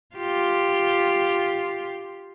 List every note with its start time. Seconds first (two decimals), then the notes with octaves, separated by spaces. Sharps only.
0.15 F4 G4